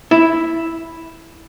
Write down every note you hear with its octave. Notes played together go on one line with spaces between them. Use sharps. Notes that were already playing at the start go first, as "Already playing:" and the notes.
E4